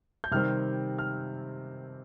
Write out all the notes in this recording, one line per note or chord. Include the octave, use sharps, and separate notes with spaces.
G6
C3 D#3 G3 C4 F6
F6